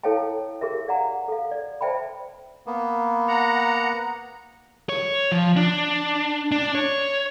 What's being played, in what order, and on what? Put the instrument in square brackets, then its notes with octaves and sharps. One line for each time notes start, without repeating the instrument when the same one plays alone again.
[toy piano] E4 A4 C#5 F5 G5 A5
G4 G#4 A#4 E5
D5 F5 F#5 G#5 A#5
A4 F5
D5
C5 D5 E5 G5 A5 B5
[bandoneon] A#3 B3
[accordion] F#5 A#5
[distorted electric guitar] C#5
F3
D4
D4
C#5